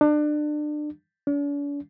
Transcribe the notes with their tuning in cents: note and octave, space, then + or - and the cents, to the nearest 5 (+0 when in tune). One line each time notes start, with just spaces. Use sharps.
D4 +30
D4 -45